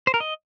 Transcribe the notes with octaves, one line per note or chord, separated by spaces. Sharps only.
C5
A#4
D#5